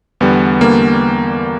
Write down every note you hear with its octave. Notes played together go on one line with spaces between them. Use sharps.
E2 D3 G3 B3
D3 G3 A#3